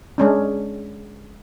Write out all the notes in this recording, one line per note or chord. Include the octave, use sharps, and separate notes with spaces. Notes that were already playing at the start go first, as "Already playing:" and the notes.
G#3 C#4 D4